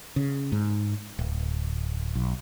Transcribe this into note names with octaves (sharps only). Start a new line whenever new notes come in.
C#3
G#2
D1
B1